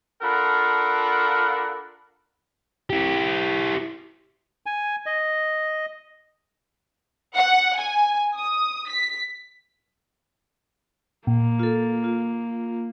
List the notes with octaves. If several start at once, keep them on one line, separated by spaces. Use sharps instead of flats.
D4 F4 A4 A#4 F#5 B5
E4 G4
G#5
D#5
F#5
G#5
D#6
B6
A#2 A#3
F4 A4
F4